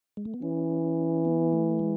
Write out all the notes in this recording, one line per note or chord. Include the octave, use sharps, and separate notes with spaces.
G#3
A3
B3
E3 C#4
B3
A3
G#3